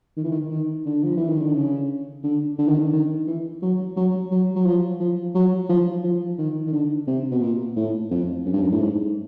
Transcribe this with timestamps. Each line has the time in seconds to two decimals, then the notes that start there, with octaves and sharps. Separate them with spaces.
0.17 D#3
0.24 E3
0.32 D#3
0.51 D#3
0.86 D3
1.04 F3
1.17 E3
1.29 D#3
1.42 D3
1.55 C#3
2.23 D3
2.59 D3
2.68 D#3
2.79 D3
2.93 D#3
3.27 E3
3.62 F#3
3.97 F#3
4.31 F#3
4.55 F#3
4.65 F3
5.00 F3
5.35 F#3
5.69 F3
6.03 F3
6.38 D#3
6.67 D#3
6.73 D3
7.07 C3
7.31 B2
7.42 A#2
7.76 A2
8.11 F2
8.46 F#2
8.53 G2
8.61 F#2
8.72 A2
8.80 G#2